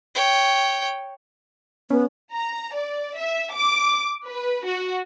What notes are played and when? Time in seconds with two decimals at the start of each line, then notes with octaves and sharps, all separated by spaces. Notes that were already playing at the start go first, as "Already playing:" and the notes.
0.15 C#5 G5
1.90 B3 C#4
2.32 A#5
2.75 D5
3.18 E5
3.52 D6
4.27 B4
4.66 F#4